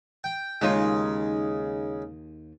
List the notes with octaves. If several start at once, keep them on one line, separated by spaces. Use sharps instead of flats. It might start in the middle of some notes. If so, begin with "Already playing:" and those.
G5
D#2 C#3 G#3 D#4 F4